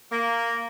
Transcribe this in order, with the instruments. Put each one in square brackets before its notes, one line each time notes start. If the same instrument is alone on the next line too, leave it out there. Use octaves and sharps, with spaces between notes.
[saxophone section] A#3